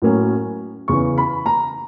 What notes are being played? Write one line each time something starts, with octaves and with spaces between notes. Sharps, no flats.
A2 F#3 A#3 C#4
E2 C#3 E3 C#6
B5
A#5